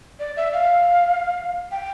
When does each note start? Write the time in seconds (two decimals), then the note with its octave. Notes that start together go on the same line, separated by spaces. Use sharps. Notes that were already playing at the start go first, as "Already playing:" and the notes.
0.20 D5
0.37 E5
0.53 F5
1.72 G5